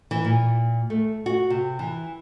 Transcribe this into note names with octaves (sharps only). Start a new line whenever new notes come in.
E3
A#2
A3
F#4
C3
E3